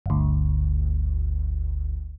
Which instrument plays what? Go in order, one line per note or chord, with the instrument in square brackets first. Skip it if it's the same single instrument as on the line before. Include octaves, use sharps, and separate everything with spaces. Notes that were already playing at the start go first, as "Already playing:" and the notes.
[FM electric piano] G1 D2